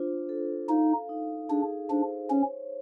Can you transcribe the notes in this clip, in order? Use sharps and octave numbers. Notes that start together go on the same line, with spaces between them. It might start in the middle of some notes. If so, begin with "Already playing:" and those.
Already playing: D4 F4 C5
A4
D#4 F5
D#4
D4 G#4
D4 C5
C#4 C#5